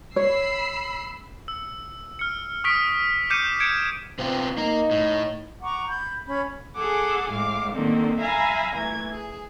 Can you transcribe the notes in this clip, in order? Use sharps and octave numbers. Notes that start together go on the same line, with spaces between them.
C#5 B5 E6 C7
E6
F6 C#7
C#6 D#6 F6 B6 D7
D6 F6 G6 C7 C#7 D#7
G#6 C#7 D7 E7
C3 B3 C4 F4
A#3 D#4 A#4
A2
F#5 A#5 C#6 D6
B5 G6
C#4 B5
G#4 A4 F#5 G#5 D6
A2 G#3 F5 D6
D3 D#3 A#3 C4 D#4
E5 F5 G#5 A#5 B5
E3 A3 G#6
G#4